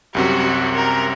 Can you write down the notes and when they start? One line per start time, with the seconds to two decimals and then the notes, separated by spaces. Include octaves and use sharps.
0.15 C2 F#2 C3 F#4
0.75 A#4